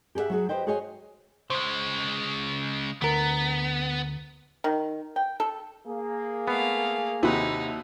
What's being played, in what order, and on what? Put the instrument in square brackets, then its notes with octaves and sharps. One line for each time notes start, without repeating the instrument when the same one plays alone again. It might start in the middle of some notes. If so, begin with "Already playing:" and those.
[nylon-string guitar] G4 G#4 B4 E5 F#5
F#3 F#4 G#4
G4 A4 B4 C5 D#5 G5
F#4 G#4 C5 C#5 D#5 G#5
[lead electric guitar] C#3 G#3 [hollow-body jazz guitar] C5
[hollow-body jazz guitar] D2 A#4 [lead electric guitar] B3
[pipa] D#3
G5
A4
[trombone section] A#3 G#4
[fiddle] A3 F5 [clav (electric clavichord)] B3
[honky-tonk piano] D#2 E4 F#4 [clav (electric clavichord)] C3 B4 [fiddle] D#4